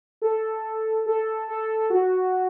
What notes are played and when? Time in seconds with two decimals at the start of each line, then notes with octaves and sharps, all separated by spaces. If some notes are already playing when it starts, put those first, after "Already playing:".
0.22 A4
1.06 A4
1.48 A4
1.90 F#4